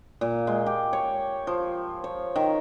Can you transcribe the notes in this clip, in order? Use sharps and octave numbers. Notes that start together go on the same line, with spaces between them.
A#2
G#3
G4
C#5
F3
C#5
D#3